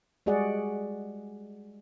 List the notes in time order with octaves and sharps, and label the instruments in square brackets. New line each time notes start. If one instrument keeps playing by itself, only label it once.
[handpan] G3 G#3 F#4 G#4 D5 F#5